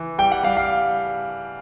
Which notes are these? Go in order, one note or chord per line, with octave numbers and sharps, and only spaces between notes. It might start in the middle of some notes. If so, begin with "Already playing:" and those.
Already playing: E3
G3 G5
F#5
G3 F5
F5